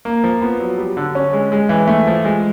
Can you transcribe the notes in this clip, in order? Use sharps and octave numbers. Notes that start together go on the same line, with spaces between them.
A#3
F3
B3
F#3
G3
D3
C#4
G#3
G#3
E3
A3
F3
G#3